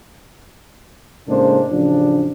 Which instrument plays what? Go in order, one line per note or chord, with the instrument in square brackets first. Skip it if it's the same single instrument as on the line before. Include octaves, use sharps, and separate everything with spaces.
[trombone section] A2 C#3 G#3 A#3 D4 C5
A1 C#3 F3 D4